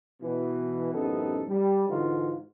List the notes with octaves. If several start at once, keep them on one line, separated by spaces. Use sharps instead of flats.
B2 E3
A1 F#2 C3 B3 D#4 A4
G3
G#2 D3 E3 D#4 F4 F#4